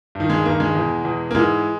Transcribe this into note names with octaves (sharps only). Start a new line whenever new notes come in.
G2 D#3
G#3
G2 D#3 A#3
G#3
E2 B2
E2 B2
A#3
G#2 E3 G#3